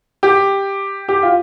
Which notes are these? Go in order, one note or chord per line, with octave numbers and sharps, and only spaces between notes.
G4
G4
F4